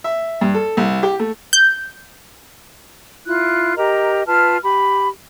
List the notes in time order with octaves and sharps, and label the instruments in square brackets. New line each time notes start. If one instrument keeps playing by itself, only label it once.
[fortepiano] E5
G2
A4
C2
G4
A3
[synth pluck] G6
[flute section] E4 F4 F#6
G4 A#4 D#5 A#5
F4 B4 A5 F6
G4 B5